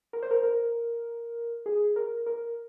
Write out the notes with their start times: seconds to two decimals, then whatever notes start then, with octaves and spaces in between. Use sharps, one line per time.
0.13 A#4
0.22 C5
0.31 A#4
0.43 A#4
1.66 G#4
1.96 A#4
2.26 A#4